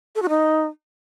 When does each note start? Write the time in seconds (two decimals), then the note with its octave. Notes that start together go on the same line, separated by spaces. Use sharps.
0.15 A4
0.22 F#4
0.29 D#4